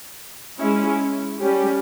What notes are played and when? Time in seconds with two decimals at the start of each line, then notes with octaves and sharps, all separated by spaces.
0.57 G#3 C#4 E4
1.38 G3 C#4 G4